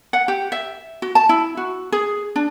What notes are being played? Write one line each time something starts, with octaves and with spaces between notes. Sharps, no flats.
F#5
G4
E5
F#4
A5
E4
F#4
G#4
D4